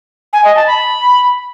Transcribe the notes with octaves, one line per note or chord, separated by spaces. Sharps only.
G#5
D#5
A5
B5